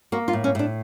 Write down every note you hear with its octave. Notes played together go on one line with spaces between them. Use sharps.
A#3 F#4
F4
A2
C#4
A2 D4